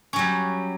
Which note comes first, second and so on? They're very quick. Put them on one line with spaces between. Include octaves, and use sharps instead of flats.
C#4 F#3 G3